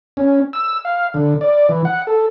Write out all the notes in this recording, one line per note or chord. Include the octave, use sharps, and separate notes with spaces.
C#4
E6
F5
D3
D5
E3
F#5
A4